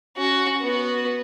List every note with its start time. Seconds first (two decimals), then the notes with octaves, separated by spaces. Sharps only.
0.17 C#4 F#4
0.61 B3 F#4